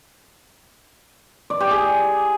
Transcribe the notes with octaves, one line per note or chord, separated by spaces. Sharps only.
D5
G4
G#4